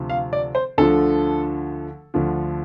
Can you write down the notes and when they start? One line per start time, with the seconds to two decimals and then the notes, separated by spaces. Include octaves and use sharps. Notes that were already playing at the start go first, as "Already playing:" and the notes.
Already playing: D2 C3 F3
0.10 F5
0.33 D5
0.55 C5
0.78 D2 D3 F3 A4
2.14 D2 D3 F3